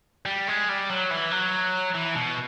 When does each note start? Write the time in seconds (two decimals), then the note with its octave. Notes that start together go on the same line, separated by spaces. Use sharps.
0.26 G3
0.48 G#3
0.69 G3
0.90 F#3
1.10 E3
1.31 F#3
1.94 E3
2.15 B2